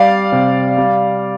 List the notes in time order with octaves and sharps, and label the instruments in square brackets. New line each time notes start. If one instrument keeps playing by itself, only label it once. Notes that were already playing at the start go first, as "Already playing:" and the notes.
Already playing: [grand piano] G3 D5 F5
C3
G3